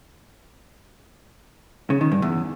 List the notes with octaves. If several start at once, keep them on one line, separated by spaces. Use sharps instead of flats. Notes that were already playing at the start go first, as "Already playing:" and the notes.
C#3
D#3
G2
E2